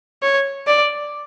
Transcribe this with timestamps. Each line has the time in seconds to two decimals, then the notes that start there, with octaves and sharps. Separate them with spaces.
0.22 C#5
0.67 D5